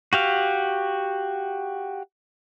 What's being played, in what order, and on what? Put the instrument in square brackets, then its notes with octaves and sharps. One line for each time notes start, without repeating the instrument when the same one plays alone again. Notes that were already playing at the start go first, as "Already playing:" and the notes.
[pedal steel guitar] F#4 G4 F5